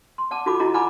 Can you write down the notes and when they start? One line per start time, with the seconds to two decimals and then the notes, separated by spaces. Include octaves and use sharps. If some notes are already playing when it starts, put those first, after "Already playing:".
0.18 C6
0.31 D5 F#5 A5 D6
0.46 D#4 F4 F#4 A4 B5 D6
0.59 D#4 E4 F#4 D#5 A5 A#5
0.74 D5 F#5 G#5 A#5 B5 D6